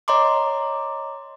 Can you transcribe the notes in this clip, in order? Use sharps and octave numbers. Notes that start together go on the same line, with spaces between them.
C#5 D#5 A#5 C6 D6